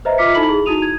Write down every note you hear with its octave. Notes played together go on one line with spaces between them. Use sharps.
B4 C5 D#5 E5 A#5
F4 E5 D6 F6 B6 C#7
D#4 E4 A4 B5 F#7
G#4
D#4 E4 F#4 D#6 D#7 F7
G#6